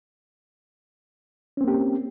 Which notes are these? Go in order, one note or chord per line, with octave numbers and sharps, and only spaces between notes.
A#3 C4 C#4 G4